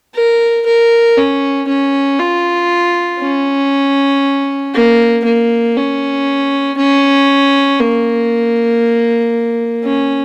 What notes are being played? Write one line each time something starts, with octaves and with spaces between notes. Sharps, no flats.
A#4
A#4
C#4
C#4
F4
C#4
A#3
A#3
C#4
C#4
A#3
C#4